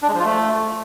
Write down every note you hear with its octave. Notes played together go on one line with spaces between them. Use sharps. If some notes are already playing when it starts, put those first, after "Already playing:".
D4
G#3
F3
F4
A3